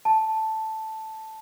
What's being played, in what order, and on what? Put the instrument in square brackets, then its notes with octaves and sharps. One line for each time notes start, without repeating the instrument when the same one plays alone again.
[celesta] A5